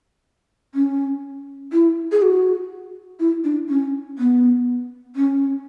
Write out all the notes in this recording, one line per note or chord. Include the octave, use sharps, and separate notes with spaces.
C#4
E4
G#4
F#4
E4
D4
C#4
B3
C#4